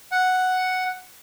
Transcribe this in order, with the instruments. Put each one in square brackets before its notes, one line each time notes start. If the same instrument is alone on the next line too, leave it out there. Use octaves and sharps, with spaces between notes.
[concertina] F#5